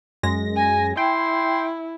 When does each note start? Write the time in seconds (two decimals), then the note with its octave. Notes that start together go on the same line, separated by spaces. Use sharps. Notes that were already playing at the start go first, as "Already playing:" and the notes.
0.23 F#2 G#3 A#6
0.56 G#5
0.97 E4 G5 C6